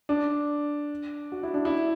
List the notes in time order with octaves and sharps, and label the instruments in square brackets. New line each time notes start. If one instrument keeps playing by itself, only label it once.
[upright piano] D4
F#4
E4
D4
E4